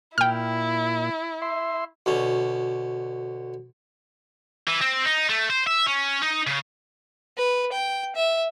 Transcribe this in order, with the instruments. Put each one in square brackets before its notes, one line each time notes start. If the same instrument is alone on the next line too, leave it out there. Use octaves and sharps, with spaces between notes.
[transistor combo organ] A#2 [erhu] E4 [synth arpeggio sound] G5 F6
[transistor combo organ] E5 C6
[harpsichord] D2 B2 C#4
[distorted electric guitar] E3
C4
D#4
A3
C5
E5
C#4
D#4
C#3
[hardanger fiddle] B4
G5
E5